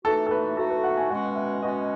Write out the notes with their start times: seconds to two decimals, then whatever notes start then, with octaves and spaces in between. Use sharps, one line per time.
0.05 E3 A3 D#4 F#4 A4
0.27 A4
0.31 B4
0.57 E3 A3 D#4 F#4 A4
0.70 B4
0.84 F#5
0.97 G#5
1.10 B2 G#3 C#4 F#4 F#5
1.25 F#5
1.36 E5
1.62 B2 G#3 C#4 F#4 D#5